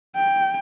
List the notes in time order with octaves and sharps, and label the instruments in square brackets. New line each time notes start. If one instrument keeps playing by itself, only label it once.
[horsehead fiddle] G5